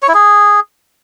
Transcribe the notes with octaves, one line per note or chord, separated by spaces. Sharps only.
C#5
E4
G#4